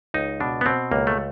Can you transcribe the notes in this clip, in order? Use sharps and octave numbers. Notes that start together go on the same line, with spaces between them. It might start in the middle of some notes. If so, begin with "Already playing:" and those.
C#2 D#4
B2 D4
B3
B2 C4
C#2 A#3
A3